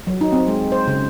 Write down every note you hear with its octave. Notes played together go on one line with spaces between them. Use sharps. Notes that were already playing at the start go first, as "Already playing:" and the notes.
F#3
D#4
C4
G#3
C5
C#3